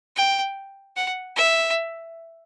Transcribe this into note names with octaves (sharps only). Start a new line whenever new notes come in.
G5
F#5
E5